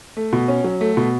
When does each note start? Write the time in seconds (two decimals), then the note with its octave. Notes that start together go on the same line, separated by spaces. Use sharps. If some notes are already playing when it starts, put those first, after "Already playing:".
0.17 A3
0.33 B2
0.48 C#4
0.64 F#3
0.81 A3
0.97 B2